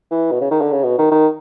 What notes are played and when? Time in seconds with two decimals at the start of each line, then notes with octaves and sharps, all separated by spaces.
0.11 E3
0.31 B2
0.41 C#3
0.50 D#3
0.61 D3
0.72 C#3
0.84 B2
0.98 D#3
1.11 D#3